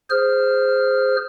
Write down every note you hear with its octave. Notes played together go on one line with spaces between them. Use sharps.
G#4 C5 F6